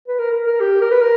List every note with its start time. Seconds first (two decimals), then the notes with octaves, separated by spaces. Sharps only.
0.08 B4
0.19 A#4
0.32 A#4
0.46 A#4
0.60 G4
0.81 A#4
0.91 B4
1.01 A#4